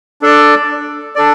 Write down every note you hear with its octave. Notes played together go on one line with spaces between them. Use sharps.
D4 A4 D5
D4 A4 D5